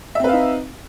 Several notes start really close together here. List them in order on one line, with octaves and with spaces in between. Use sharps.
E5 C4 B4 F5 D#4